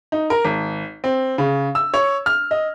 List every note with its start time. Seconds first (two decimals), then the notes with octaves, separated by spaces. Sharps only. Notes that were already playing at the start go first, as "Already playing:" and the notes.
0.12 D#4
0.30 A#4
0.45 G#1
1.04 C4
1.38 C#3
1.75 E6
1.94 C#5
2.26 F6
2.51 D#5